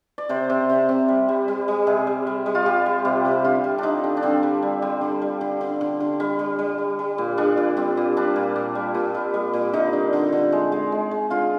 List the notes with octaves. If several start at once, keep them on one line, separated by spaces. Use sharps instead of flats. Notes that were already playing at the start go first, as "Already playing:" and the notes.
D5
C3 C5
C3
C3
C3
G3
G3
G3
G3
C3 G#4
G3
G3
G3
F4
G3 G4
G3
C3 G4
C3
D3 F4
G3
D3 D4 D#4
D3
D4
D3 C4
G3
G3
G3
D3
G3
D3
D3
D3
D3
G3
G3
G3
G3
G3
A#2
G3 D4
A#2
G3 C4
A#2
G3 D4
A#2
A#2
G3
A#2
G3
G3
A#2
D3 D#4
D3
D3
D3
G#3
G#3
G#3
G#3
D3 F4